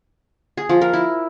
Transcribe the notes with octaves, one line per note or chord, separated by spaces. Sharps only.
G#4
F3
A#4
E4